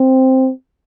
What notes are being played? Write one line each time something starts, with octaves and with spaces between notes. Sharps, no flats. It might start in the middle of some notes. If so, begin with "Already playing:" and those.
Already playing: C4